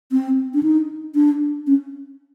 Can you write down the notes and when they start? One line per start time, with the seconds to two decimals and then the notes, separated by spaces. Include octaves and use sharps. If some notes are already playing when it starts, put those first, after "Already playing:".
0.12 C4
0.54 D4
0.63 D#4
1.15 D4
1.67 C#4